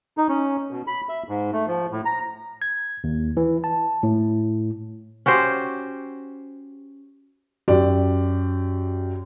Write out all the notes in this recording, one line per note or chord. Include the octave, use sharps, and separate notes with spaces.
D#4
C#4
B2
B5
E5
G#2
A3
F3
A2
A#5
G#6
D#2
E3
A5
A2
C#4 F#4 G4 C5
F#2 G4 D5